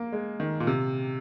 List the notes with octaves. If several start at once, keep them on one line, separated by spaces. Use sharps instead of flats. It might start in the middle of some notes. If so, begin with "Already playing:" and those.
Already playing: A#3
G#3
D#3
A#2
C3